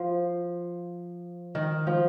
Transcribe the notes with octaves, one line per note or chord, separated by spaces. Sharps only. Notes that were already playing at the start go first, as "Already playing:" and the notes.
Already playing: F3
D#3
F3